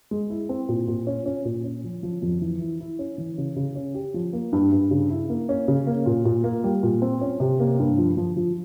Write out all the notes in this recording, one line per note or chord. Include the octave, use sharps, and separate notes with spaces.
G#3
E4
C4
A#2
A#2
C#4
C#4
A#2
C#4
F3
F3
F2
E3
E4
E4
C#4
E3
C#3
C#3
C#4
G4
F3
A#3
G2
G2
C#3
E4
A#3
C#4
C#3
A#3
A#2
A#2
A#3
G3
A#2
C4
C#4
C3
A#3
G2
F3
F3
F3